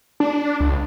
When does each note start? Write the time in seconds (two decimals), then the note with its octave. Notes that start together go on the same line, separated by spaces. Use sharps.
0.20 D4
0.60 C#2